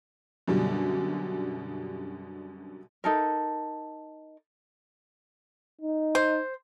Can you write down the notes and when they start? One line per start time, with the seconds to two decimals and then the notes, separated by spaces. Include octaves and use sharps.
0.48 F#2 B2 D3 G3
3.04 D#4 A4 A#4
5.81 D#4
6.15 C5